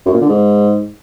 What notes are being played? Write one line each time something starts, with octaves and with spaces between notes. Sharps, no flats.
F#2
A#2
D3
G#2